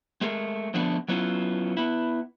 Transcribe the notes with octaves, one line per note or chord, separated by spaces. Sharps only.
G#3 A3 G#4 A#4
D3 F3 G#3 A3 B3 D4
F#3 B3 C#4 E4 F4
B3 E4